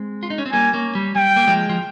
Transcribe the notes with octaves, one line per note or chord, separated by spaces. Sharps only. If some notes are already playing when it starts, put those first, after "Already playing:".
Already playing: G#3 C4
F4
D#4
C#4
C4
G3 A#3 G#5
A#3 C#4
G3
G3 G5
A#3
F3 G#3
F3